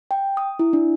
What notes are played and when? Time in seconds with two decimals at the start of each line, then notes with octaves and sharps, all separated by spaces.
0.11 G5
0.37 D#6
0.59 E4
0.73 D4